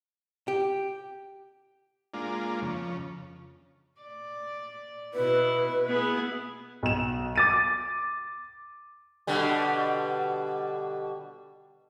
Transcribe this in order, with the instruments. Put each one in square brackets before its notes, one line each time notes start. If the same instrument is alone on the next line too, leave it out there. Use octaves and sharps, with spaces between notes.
[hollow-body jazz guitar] G4
[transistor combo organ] G#3 A#3 D4 F4
F2 C#3
[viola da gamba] D5
[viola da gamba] B2 E4 [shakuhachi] B4
[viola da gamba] B3 E4 G#4
[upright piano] B1 E7
D6 A6 D#7
[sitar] B2 D3 G3